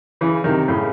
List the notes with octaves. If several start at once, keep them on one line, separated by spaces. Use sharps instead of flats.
C#3 E3
C3 D#3
A2 C#3